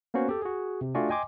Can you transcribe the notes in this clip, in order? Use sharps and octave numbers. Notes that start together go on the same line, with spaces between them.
A#3 B3 C#4 F#4 C5
G4 A4
F#4 G#4
C3
A3 D4 F4 F#4 D5 G#5
D#5 G5 G#5 C6 D6